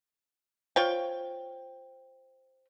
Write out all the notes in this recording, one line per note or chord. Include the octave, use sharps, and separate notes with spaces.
F4 C5 C#5 G5